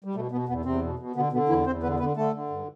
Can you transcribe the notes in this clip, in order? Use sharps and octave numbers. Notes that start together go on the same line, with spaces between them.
G3
B2 A3
B2 B3
E2 B2 B3
E2 C3 C4
B2
B2
B2 D3 B3
B2 D3 B3
E2 E3 E4
E2 C4 C5
D3 B3 B4
D3 B3 B4
D3 A3 A4
D3
G2